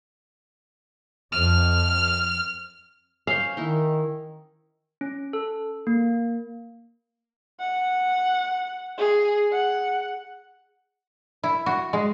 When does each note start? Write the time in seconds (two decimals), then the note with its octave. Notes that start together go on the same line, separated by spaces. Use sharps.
1.32 F2 F6
3.27 C#4 C5 F5
3.57 D#3 D#4 E4
5.01 C#4
5.33 A4
5.87 A#3
7.60 F#5
8.98 G#4
9.52 F#5
11.43 E4
11.66 F#4
11.93 G#3